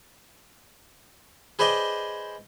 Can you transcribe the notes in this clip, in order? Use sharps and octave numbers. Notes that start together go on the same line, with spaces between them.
G#4 B4 C5 D5 D#5 G5